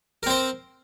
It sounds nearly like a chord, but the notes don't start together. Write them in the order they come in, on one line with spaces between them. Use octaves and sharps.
A#4 C4 C5